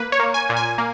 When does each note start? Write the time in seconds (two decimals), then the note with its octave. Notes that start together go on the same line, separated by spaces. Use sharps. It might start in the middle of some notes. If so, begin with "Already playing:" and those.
Already playing: A#3 B4
0.12 C#5
0.19 A#3
0.34 G#5
0.49 A#2
0.57 G#5
0.78 A#3